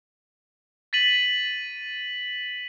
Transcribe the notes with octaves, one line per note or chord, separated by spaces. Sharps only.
A6 B6 D#7 F#7